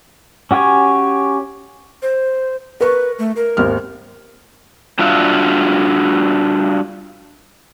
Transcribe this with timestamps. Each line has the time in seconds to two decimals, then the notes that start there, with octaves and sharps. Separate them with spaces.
0.51 C#4 F#4 G4 C#5 G#5
2.02 C5
2.81 A#4 B4 C#6
3.19 A3
3.36 A#4
3.57 G#1 D#2 F6
4.99 G3 D4 F4 F#4 E5 F5